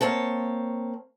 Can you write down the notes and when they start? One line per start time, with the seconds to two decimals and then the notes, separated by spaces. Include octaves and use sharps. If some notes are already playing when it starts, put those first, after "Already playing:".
0.01 A#3 C4 C#5 A5